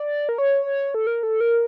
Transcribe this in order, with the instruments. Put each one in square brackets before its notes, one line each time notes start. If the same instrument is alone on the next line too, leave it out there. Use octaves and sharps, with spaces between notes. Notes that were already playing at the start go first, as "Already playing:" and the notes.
Already playing: [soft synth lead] D5
A#4
C#5
A4
A#4
A4
A#4